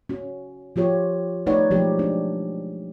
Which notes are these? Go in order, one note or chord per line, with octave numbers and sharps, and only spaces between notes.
C#4 F#4
F3 F4 G4 C#5
A3 D#4 B4 C#5 D5 F#5
B2 F3 F#3 G#3 D#4 G4
D4